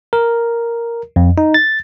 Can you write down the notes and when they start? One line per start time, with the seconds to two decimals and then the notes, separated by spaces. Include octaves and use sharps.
0.13 A#4
1.16 F2
1.38 D#4
1.54 A6